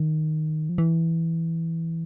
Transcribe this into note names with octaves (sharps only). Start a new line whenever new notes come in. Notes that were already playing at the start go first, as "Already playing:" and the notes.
Already playing: D#3
F3
E3